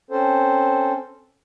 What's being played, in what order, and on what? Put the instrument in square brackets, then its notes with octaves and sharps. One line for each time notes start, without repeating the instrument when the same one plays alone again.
[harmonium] C4 C#4 A4 C5